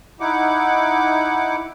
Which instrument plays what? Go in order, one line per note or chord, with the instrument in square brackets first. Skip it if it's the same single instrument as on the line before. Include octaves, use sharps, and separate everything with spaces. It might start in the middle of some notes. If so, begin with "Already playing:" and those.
[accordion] D#4 E4 F#5 D6